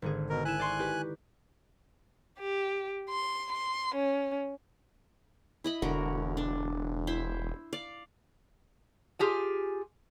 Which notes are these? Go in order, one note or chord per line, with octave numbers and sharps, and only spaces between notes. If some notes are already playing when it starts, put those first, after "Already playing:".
G#1 D3 G#4
B2 A#4
E4 G#5 F#6 E7
D5 C6 C#6
D#4 G4 B4
G4
C6
C6
C#4
E4 D#5 B5
E1 D3 F#4 A#4
D4
E4 C5 E5
D5 F5
F4 G4 G#4 G#5